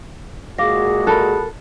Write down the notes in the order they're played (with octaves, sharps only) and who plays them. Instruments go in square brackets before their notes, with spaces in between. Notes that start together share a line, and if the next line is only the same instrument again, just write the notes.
[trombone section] A#2 G#3 F#4 [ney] G#4 [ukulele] F5 [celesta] D6 A#6
[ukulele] A4 A#4 [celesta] A5 B5 F#6